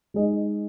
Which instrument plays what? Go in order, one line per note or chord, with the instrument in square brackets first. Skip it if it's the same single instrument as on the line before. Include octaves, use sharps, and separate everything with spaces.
[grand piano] G#3 D#4 G#4 D#5